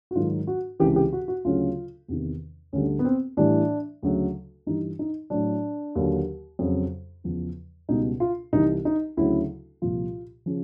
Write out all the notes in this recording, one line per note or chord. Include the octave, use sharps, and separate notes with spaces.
F#4
G#2 D#3 F#3 F4
F#4
C#2 C3 E3 G4
G4
F#4
F#4
D2 C#3 F#3 F4
E2 C3 D#3
D2 D3 G3 C#4
B3
C4
A2 E3 G3 D4
D2 C#3 F#3
G2 E3 G3 D#4
D#4
A2 F#3 D4
D#2 D3 F#3
F2 C#3 F#3
E2 C#3 F3
C#2 B2 G3 D#4
F4
C2 C3 E3 D#4
D#4
D2 C#3 F#3 E4
C2 A#2 F3 F4
C#3 F3